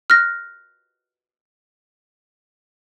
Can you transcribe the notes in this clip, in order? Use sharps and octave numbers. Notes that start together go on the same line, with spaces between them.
F6 F#6 A#6